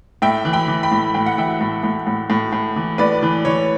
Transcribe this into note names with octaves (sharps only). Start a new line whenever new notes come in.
A2 E5 G5
E3
G5 B5
E3
G5 B5
A2
A2 G5
F#5
E3 E5 G5
A2
A2
A2
A2
A2
E3
A2 B4 D5
E3
E3 C#5